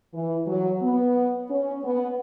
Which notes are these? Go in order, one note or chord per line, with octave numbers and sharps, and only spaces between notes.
E3
F#3
B3
C#4
B3